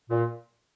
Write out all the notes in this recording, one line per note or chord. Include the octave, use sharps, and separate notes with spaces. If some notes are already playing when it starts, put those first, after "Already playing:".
A#2